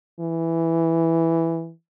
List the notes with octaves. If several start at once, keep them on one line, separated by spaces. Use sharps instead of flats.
E3